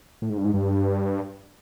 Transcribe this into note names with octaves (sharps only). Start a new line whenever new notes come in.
A2
G#2
G2
G#2
G2